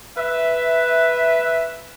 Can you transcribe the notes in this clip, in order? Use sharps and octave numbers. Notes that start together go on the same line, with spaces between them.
B4 E5